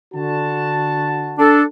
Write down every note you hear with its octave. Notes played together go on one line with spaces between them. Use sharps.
D3 F#4 A5
D4 A4